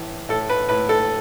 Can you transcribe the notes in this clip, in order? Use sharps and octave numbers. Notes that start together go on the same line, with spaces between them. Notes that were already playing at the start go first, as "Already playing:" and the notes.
Already playing: A2 E3
A2 A4
B4
A2 B4
A4